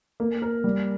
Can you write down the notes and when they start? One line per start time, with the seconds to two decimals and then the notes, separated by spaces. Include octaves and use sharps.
0.20 A#3
0.42 A#4
0.64 G3